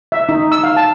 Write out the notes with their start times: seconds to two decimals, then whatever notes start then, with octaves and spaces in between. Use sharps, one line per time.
0.12 E5
0.29 D#4
0.52 E6
0.63 F5
0.77 A5